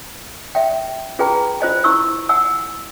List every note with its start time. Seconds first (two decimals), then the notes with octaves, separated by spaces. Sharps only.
0.55 E5 G5
1.19 F4 G#4 B4 G5 G#5 A#5
1.60 F4 C5 D#5 G#5
1.84 E4 C#6 E6
2.29 F#5 G#5 E6